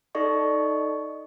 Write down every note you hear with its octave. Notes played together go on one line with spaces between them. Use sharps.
D#4 A4 D5 D#5 C#6